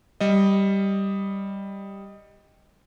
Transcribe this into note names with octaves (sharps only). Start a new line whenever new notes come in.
G3 D#5